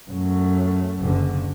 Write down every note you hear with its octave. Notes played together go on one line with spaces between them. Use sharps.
F#2 A3
F#1 D3